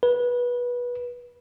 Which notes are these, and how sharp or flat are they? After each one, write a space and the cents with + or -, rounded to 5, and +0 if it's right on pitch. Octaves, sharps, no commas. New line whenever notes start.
B4 -20